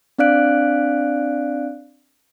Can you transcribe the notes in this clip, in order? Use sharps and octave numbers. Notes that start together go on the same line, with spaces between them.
C4 D4 D5 F5 F#6 D7